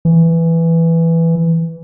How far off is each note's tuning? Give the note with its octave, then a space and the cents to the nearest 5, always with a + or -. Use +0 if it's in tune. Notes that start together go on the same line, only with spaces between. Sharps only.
E3 +5